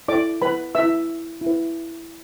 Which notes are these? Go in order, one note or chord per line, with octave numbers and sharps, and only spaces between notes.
E4 A4 D5 D6
B4 B5
E4 B4 E5 E6
E4
B4